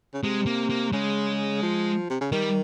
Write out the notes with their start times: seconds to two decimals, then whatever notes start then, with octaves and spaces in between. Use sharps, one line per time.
0.14 C#3
0.23 C3 G#3
0.46 A#3
0.70 A#3
0.93 C#3 G#3
1.62 F3
2.10 C3
2.21 C#3
2.32 D#3 G3